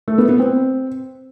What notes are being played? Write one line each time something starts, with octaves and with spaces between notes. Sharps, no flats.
A3
B3
B3
C4